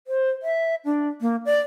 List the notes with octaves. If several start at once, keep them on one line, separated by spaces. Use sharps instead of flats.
C5
E5
D4
A#3
D5